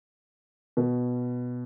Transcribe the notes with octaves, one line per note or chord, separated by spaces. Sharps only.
B2